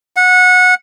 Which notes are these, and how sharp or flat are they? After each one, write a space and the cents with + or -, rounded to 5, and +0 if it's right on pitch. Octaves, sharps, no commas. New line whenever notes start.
F#5 -20